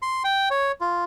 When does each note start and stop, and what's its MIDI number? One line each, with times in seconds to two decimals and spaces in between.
0.02 0.23 84
0.24 0.49 79
0.51 0.72 73
0.81 1.04 65